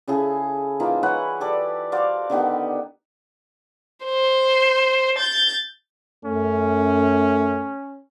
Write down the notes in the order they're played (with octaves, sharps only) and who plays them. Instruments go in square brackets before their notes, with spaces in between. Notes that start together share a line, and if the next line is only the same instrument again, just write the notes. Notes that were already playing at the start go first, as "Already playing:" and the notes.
[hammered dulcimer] C#3 E4 G#4 A4
E3 A#3 D#4 F4
E4 B4 C#5 F#5
G4 A4 D5
F#4 C5 D5 F5
D3 D#3 B3 G4
[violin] C5
G6 A6
[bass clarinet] F#2 [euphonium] A3 [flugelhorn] C#4